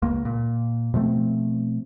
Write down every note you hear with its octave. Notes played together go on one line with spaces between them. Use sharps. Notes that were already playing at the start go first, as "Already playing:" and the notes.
C#2 A#3
A#2
B2 F3 A3 C4